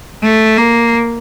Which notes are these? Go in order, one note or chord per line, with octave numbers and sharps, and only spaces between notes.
A3
A#3